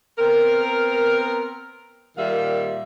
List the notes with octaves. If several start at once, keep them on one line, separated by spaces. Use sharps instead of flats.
B3 C4 A#4
A#2 D#3 G3 E5 F5